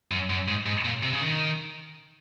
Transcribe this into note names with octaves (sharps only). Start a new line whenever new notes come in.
F#2
F#2
G#2
G#2
A#2
C3
C#3
D#3